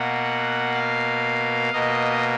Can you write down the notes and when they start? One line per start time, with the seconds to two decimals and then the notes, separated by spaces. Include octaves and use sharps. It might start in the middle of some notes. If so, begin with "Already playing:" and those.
Already playing: B2 A#3 F#5
0.75 F5
1.73 B2 A#3 D#5